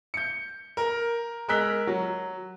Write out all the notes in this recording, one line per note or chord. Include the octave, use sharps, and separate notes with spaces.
G6 C#7
A#4
G#3 A#4 E6 F#6 B6 G7
F#3